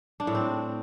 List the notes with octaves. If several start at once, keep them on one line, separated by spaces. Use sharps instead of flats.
D4
A2
C4